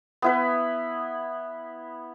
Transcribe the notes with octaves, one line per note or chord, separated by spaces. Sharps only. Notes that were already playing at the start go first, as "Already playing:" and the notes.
B3 E4 B4